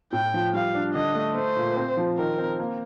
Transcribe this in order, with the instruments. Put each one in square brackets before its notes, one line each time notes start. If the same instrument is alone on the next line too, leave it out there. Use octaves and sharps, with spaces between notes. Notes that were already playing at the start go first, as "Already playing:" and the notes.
[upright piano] A2 [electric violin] G5
[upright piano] F3
[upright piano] G3 [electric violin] F5
[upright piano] D4
[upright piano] D3 [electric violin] D#5
[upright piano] A3
[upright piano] A3 [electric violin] C5
[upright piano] A#2
C4
F3
[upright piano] D#3 [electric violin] A#4
[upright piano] C4
A#3